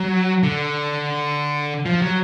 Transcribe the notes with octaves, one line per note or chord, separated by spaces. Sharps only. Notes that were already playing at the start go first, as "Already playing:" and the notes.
Already playing: F#3
D3
F3
F#3